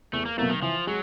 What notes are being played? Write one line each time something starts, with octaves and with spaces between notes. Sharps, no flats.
E2 A3
A#3
B2 F#3 A3 A#3
D#3
E3 F3
F#3 G#3